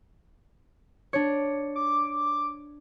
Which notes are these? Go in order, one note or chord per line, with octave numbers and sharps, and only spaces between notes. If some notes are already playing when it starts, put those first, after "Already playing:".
D4 C#5
D6